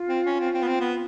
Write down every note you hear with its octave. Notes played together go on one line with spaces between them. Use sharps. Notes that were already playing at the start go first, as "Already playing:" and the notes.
Already playing: F4
C4
C#4
C4
C4
B3
C4
B3